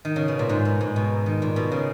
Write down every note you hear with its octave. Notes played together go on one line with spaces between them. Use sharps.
D#3
C#3
B2
A#2
G#2
B2
G#2
B2
D#3
A#2
B2
C#3